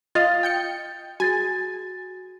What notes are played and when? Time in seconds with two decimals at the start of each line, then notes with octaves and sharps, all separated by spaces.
0.15 F4 D#5 F5 A6
0.43 G5 G6 C#7
1.20 F#4 G#4 G#5 A6